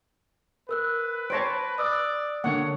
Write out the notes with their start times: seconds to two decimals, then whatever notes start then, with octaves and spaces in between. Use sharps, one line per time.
0.69 A#4 B4 E6 F#6
1.30 C5 C#5 A5 A#6 D7
1.78 D5 D#6 E6 F#6
2.44 D3 A#3 C#5 F#5